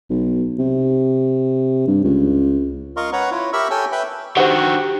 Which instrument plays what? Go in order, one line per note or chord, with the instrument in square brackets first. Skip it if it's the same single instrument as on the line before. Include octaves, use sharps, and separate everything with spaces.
[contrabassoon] B1
C3
G2
C#2
[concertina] F4 A#4 D#5 F5 C6 C#6
B4 C#5 F#5 A#5
E4 F4 C#5
G4 A#4 E5 B5 C#6 E6
A4 C#5 G5 G#5 E6
B4 E5 G5 B5
[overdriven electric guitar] D3 D#3 [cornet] F#4 [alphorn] G4 [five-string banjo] C5 F#5